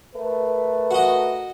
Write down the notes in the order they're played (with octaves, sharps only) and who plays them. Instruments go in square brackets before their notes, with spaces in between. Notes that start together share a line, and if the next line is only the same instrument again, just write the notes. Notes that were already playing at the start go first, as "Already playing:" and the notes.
[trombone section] A3 A#4 B4
[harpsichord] F#4 D#5